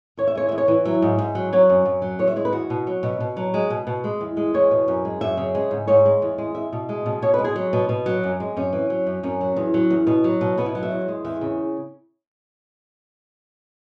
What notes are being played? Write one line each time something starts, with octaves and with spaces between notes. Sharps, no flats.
E2 C#5
E5
G#3 C#5
E2 E5
C#5
E3
F#3 E5
G#2
G#2
F#3
F#3 C#5
F#2
F#2
F#3
E2 C#5
E5
G#3 C#5
B4
E2 F#4
B2
F#3
B2
B2
F#3
G#3
B2
B2
G#3
E2
G#3
E2 C#5
B2
F#2
G#3
F#2 E5
C#3
G#3
G#2
G#2 C#5
G#3
E2
G#3
E2 E5
B2
G#3
B2
B2 C#5
B4
G#3
G#4
F#3
B2
B2
F#3
F#2
G#3
F#2 C#4
E3
F#3
F#2
F#2 C#4
F#3
E2
F#3
E2
B2
F#3
B2
B2 B3
E4
F#3
E5
E2
G#3
E2 E5
C#3